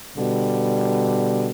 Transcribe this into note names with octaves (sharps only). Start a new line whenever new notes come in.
B2 D3 G3